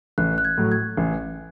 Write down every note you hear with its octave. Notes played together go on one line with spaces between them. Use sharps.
A1 F#6
F#6
G#6
A2 F#3
G#6
A1